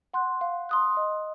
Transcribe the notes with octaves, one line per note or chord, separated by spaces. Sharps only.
F#5 C6 F#6
F5
C6 D#6 F#6
D#5